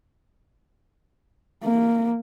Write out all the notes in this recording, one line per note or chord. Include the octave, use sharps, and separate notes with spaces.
A#3